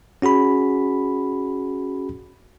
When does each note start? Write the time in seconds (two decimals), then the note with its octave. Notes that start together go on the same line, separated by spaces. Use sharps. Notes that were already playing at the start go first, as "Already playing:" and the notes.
0.22 C#4 F#4 G#4 B5